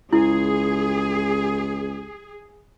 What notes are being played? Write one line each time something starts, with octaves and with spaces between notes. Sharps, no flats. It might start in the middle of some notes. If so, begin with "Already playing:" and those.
C#2 E4 G#4